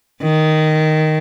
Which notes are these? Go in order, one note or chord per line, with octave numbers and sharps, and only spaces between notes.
D#3